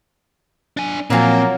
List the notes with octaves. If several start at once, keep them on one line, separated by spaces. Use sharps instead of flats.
D4 G#5
A#2 F3 F#3 A#3 C4 F4 G#5